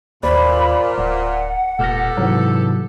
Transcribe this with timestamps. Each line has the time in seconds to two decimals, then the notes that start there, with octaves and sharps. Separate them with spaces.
0.23 G#1 D#2 A#2 C5 D5 B5
0.98 D1 F#5
1.79 E1 A#2 B3 G4 A4 F6 A#6
2.17 G#2 C3 E3 F#3